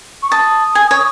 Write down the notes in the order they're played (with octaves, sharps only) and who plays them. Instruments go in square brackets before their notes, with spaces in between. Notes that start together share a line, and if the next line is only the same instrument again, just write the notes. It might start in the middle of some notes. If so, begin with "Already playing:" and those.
[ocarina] C#6
[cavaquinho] A5 [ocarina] D#6
[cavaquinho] G#5
C#5